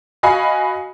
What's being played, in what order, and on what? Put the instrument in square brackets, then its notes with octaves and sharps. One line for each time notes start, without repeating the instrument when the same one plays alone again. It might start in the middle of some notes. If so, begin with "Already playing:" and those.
[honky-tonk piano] F#4 D#5 F5 G#5 B5